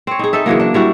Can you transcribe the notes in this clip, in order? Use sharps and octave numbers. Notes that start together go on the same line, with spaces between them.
C4 C#5
D#4 G#4
D#4 A4 E5
C#3 E3 F#3 A#3
D4
G3 E4 F#4